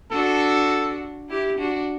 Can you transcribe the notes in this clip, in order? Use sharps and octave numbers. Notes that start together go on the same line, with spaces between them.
D4 F#4 A4
E4 G4
D4 F#4